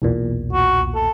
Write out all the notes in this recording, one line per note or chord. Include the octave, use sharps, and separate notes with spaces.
B1 E2 A#2
F#4
A4